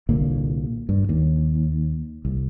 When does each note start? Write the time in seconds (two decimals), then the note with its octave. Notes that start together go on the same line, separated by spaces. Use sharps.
0.09 C2 A#2 D3 A#3
0.89 G2
1.09 D#2
2.25 C2